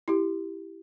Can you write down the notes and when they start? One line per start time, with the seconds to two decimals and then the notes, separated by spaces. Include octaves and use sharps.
0.08 E4 G4